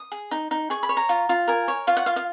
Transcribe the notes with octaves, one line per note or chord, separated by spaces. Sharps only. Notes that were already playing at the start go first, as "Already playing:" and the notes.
Already playing: D#6
G#4
D#4
D#4
G#4 C#6
B5
C#5
A#5
F4
F4
A#4 G#5
C#5
F4 F5
F#5
F4 F5
F5